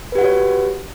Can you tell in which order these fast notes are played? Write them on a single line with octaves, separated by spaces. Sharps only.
B4 G4 F#5 F#4 C#5